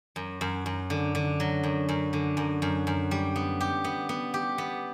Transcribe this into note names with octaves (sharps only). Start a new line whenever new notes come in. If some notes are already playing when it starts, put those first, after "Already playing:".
F#2
F#2
F#2
D3
D3
F#3
F#2
F#2
D3
F#2
F#2
F#2
G3
B3
G4
B3
B3
G4
B3